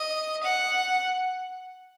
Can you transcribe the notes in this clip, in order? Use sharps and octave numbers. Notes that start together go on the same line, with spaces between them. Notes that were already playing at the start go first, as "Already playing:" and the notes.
Already playing: D#5
F#5